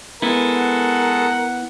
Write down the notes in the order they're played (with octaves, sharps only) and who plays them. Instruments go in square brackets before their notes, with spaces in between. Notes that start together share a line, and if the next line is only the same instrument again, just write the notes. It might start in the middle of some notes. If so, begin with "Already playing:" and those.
[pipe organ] G#3 A4 [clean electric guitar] B3 E4 [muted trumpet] A#4
[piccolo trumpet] F#5